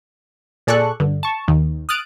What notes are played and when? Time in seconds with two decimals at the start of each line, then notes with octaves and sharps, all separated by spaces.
0.67 A#2 G#4 A4 D5 C#6 F#6
1.00 G2 D3
1.23 A5 C#6
1.48 D#2 D#3
1.89 D#6 F6 F#6 A6 D7